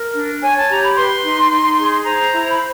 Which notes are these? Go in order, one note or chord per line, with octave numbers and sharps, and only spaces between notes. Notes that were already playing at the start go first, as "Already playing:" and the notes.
Already playing: A#4
D4
C#5 G#5
A5
G4 A#5
B5
B4 C6
D#4
D#4
G#4
C5 A#5
E4
B5